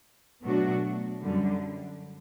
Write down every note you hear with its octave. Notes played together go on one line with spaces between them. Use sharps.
B2 F#3 A3 D4 F#4
F#2 D3 G3